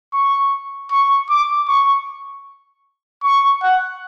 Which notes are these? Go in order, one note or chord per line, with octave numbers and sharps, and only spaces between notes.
C#6
C#6
D6
C#6
C#6
F#5